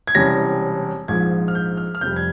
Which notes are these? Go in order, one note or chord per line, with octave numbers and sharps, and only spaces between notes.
G#6
E1 E2 C3 G3 C#4 A#6
A#1 G#2 F3 G#3 G#6
F6
G6
F6
F6
F1 F2 C3 G3 G6
G#6